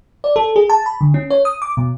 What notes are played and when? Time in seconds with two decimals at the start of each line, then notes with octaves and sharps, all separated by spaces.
0.24 D5
0.36 A4
0.56 G#4
0.70 A5
0.86 B5
1.01 D3
1.14 C#4
1.30 C#5
1.45 D#6
1.62 D6
1.77 B2